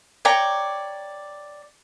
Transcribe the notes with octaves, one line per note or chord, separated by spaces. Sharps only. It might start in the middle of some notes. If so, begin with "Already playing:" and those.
C#5 D5 G5 A#5